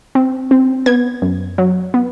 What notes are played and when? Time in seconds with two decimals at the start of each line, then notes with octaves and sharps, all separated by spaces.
0.15 C4
0.51 C4
0.86 B3 G#6
1.22 F#2
1.58 F#3
1.94 B3